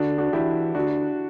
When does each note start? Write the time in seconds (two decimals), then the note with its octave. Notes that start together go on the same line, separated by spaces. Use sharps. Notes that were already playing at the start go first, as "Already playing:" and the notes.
Already playing: D3 D4 F#4
0.18 D4 F#4
0.33 E3 E4 G4
0.75 D3 D4 F#4